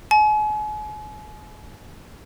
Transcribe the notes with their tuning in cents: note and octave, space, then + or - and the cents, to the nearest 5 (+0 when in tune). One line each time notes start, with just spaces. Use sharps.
G#5 +40